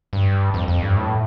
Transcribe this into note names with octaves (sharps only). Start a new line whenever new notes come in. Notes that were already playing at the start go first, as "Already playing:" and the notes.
G2
F2
F2
G2
A2